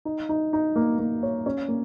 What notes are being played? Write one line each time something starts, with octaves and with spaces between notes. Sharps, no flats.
D#4
D#4
D#4
A#3
A#3
C#5
C#4
A#3